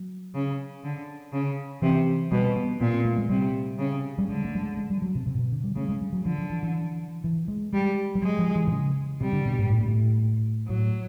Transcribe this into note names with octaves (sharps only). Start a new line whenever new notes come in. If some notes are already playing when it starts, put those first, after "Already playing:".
Already playing: F#3
C#3
D3
C#3
C3 E3
B2 G3
B3
A#2 B3
C4
A3
G#3
C3 G3
C#3
G3
D3 G#3
A3
G3
G#3
G#3
G3
F#3
C3
C3
A#2
B2
D3
G3
C#3 A3
G#3
G3
F#3
D3 F3
F3
E3
E3
E3
G#3
G3 G#3
G3
F#3 G#3
F3
E3
C3
C#3
C3 G3
D3
B2
G#2
A2
A#2
A2
A2 F#3